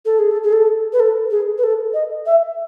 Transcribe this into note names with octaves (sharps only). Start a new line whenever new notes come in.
A4
G#4
A4
G#4
A4
B4
A4
G#4
B4
A4
D#5
E5